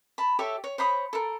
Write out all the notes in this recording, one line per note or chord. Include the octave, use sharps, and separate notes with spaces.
A5 B5
G4 A4 C#5 E5
C#5
C5 C#5 B5 D#6
A4 A#4